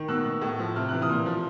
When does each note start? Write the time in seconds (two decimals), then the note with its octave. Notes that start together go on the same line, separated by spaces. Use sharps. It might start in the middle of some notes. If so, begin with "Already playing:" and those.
Already playing: D#3
0.08 B2 E6 F#6
0.26 B2
0.42 A2
0.59 F3
0.76 C3 F6
0.89 E3 F#6
1.02 D#6 F6
1.09 A#2
1.26 F3